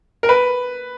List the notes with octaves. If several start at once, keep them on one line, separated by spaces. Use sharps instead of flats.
A#4
B4